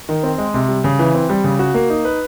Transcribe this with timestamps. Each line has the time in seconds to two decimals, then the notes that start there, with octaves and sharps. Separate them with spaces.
0.09 D#3
0.23 C4
0.38 G#3
0.54 C3
0.69 G3
0.84 C#3
0.99 E3
1.14 C4
1.30 G3
1.44 C#3
1.59 F#4
1.74 A#3
1.90 D#4
2.05 B4